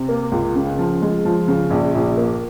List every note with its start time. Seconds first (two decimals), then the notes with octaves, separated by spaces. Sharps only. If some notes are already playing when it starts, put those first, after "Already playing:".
Already playing: C3
0.09 A#3
0.32 C#2
0.55 C#3
0.79 F3
1.02 G#3
1.25 F3
1.48 C#3
1.70 A#1
1.95 A#1
2.17 A#3